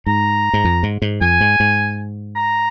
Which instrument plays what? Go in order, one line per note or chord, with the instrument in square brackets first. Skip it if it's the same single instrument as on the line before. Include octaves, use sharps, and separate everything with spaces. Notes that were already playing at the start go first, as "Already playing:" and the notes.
[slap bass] G#2 [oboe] A#5
[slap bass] G#2
F2
G#2
G#2
[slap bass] F2 [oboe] G#5
[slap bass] G#2
G#2
[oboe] A#5